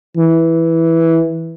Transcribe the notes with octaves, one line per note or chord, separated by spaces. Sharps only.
E3